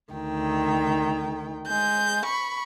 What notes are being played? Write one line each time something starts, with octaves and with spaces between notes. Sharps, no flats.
D2 D#3 G5
G#3 G6
B5 C#6